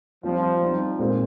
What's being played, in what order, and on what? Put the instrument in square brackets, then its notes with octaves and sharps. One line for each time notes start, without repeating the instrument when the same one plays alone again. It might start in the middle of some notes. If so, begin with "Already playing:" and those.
[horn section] F3 [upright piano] G3 C4 F4
[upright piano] G3 C4 D#4
A#2 G#3 C4 F4